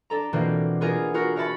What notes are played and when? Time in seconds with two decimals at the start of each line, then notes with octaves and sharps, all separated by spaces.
0.10 D4 A4 A#5
0.33 B2 E3 A#3 C4 D4 F4
0.81 B3 F4 G#4 A#4
1.14 F4 F#4 A#4
1.36 A#4 C#5 E5 A5 B5